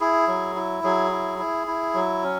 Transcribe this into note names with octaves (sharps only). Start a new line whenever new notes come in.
E4 G#4
F#3
E4
F#3 G#4
E4
E4
E4
F#3
C#4